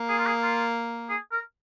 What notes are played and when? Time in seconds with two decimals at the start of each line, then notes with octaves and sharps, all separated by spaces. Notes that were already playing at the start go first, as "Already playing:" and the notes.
Already playing: A#3
0.09 G#4
0.19 F4
0.26 G#4
0.42 F4
1.09 G#4
1.32 A#4